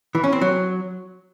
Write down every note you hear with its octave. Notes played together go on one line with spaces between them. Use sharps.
E3
C#4
C4
F#3